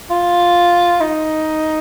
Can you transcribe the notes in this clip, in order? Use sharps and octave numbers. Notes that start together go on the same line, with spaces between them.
F4
D#4